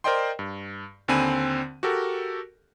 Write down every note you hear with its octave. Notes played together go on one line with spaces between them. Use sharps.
A#4 C5 D5 D#5 G5 C6
G2
D#2 D3 C4 G#5 B5 D#7
F#4 G4 A4 A#4